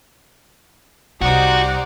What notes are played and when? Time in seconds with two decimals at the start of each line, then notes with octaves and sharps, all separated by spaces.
1.21 C2 D#4 F#4 G4 C5 D5 F#5